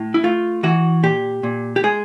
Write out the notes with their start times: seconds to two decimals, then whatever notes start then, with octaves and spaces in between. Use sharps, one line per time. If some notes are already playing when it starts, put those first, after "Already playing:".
Already playing: A2
0.14 E4
0.24 A3 F4
0.63 E3 F#4
1.03 A#2 G4
1.43 A#2
1.76 G4
1.83 G#3 G#4